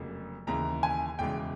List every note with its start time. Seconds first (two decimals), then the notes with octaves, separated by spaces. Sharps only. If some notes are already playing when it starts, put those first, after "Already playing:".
Already playing: F1 F2 C#3 F#3 A#3
0.47 D#2 C#3 E3 A#5
0.83 G#5
1.19 E1 E2 C#3 E3 G#3 G5